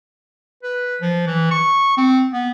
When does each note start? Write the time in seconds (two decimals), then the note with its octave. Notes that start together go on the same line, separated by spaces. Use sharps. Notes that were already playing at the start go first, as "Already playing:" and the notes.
0.63 B4
1.01 F3
1.27 E3
1.51 C#6
1.97 C4
2.33 B3